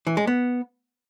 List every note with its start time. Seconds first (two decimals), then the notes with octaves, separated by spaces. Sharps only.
0.07 E3
0.17 G#3
0.27 B3